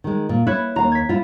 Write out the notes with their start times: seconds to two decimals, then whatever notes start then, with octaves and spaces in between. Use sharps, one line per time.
0.04 D#3 G#3
0.29 A#2
0.47 E4 B4 C#5
0.76 D#2 F5 A#5
0.92 G#6 B6
1.09 E4 F4